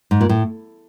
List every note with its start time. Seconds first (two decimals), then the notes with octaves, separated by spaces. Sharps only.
0.11 G#2
0.21 A#2
0.29 A2